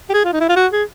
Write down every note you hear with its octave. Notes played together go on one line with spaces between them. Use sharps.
G4
G#4
F4
D#4
E4
F4
F#4
G#4